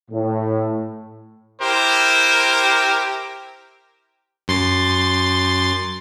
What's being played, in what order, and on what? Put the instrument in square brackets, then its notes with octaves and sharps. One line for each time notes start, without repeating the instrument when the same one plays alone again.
[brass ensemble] A2
[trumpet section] E4 G4 A#4 C5
[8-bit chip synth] F#2 C6 A6